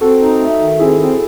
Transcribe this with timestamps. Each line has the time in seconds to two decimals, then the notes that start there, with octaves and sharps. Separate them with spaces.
0.01 C4 F#4 A4
0.21 D#4
0.40 A3
0.59 D#3
0.79 C4 E4 G#4
0.98 C4